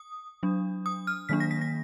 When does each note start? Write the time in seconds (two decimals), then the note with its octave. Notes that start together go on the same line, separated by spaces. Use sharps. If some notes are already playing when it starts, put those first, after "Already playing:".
Already playing: D#6
0.43 F#3 D4
0.86 D#6
1.07 F6
1.29 D#3 F#3 A#3 D4 B6
1.40 A#6
1.51 B6
1.61 A#6